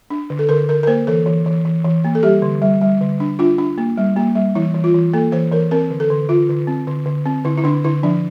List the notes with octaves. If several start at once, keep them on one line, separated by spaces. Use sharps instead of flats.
D4
D3
A4
D3 A#4
D3 A#4
A#4
A#3 C5
E3 A4
E3
E3
E3
E3
A#3
A4
G3 G4
D3
G3
G3
D3
D4
D4 F4
D4
A#3
G3
A#3
G3
E3 E4
E3
F4
E3
A#3 A4
E3 C5
E3 A#4
C4 A#4
D3
A4
D3
D3 F4
D3
C4
D3
D3
C4
D3 E4
E4
D3 D4
D3 E4
F3 D4